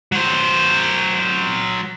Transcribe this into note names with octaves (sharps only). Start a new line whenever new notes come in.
F#3 C5